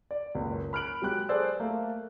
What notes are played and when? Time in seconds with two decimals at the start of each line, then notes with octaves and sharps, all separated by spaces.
0.11 D5
0.35 F#1 C#2
0.73 B5 F6 F#6 D7 F#7
1.02 F#3 G#3 G4 F#6
1.29 G#4 A4 C5 D5 E6
1.60 A3 A#3